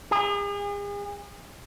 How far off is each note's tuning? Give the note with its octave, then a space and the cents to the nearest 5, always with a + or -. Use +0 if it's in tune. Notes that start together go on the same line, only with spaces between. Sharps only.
G#4 -40